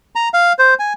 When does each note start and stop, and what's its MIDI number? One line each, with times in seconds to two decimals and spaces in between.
0.15 0.29 82
0.34 0.53 77
0.59 0.74 72
0.79 0.93 80